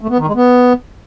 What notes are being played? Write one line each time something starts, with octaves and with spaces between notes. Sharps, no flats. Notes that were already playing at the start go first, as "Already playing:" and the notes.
A3
B3
D#3
G#3
B3